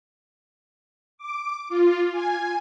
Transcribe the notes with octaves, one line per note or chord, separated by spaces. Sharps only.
D6
F4
G#5